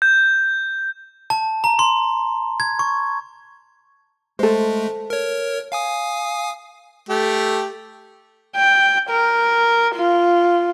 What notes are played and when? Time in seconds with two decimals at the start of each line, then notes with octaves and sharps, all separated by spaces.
0.02 G6
1.30 A5
1.64 A#5
1.79 C6
2.60 G#6
2.79 C#6
4.39 G#3 A3 A4 C5
5.10 A#4 C#5
5.72 F5 G#5 D#6
7.09 A3 G4
8.56 G5
9.10 A#4
9.95 F4